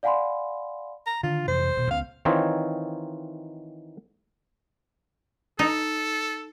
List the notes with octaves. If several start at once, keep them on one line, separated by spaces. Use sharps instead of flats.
D5 F5 F#5 G#5 B5 C6
A#5
D3 D#3 D4 F4
F2 C3 E3 C5
D#1 B2
C#2 B3 C#4 F5
D#3 E3 C4 D#4 F4 C#5
D#4 A4